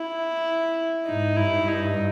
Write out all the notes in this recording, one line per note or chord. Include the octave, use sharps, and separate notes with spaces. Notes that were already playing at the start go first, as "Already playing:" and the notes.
Already playing: E4
G#2 D#4
G2 E4
D#4